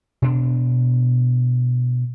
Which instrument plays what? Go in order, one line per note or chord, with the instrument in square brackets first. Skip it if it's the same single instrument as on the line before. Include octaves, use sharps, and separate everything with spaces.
[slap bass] B2 D4